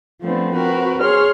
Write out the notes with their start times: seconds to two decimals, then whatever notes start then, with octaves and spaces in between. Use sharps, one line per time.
0.20 F3 A3 B3 C4 D4
0.54 C4 F#4 A#4 B4
1.01 G#4 C#5 C6 F6